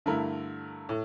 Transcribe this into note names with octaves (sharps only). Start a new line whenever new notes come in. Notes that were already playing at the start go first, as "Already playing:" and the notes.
G2 D3 A3 E4 A#4
A2